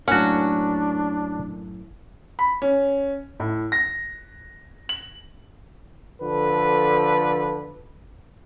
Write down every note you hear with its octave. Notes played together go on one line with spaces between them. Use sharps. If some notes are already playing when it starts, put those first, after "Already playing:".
F#2 A2 A#3 C#4 D4 F#4 F#5
B5
C#4
A2
A#6
F#7
D3 F3 A4 B4